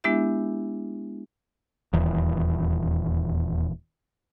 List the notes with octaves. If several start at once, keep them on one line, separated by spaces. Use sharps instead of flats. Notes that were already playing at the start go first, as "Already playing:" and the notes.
G#3 B3 D4 E4 G4 E5
D#1 E2